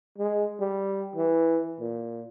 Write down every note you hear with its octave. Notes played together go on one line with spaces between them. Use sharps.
G#3
G3
E3
A#2